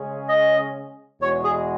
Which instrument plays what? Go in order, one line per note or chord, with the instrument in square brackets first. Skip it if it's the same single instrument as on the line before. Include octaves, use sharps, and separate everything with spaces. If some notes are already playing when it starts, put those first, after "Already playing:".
Already playing: [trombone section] C#3 G#3 C#4 G#4
[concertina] D#5
[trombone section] E2 B2 G#3 D#4 F#4 [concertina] C#5
[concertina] G#4